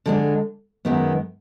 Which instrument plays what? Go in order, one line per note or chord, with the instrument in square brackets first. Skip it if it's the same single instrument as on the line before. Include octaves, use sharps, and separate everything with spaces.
[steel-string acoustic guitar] D3 G#3 D4
F#2 D#3 G#3 B3